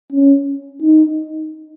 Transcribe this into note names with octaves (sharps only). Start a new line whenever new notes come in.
C#4
D#4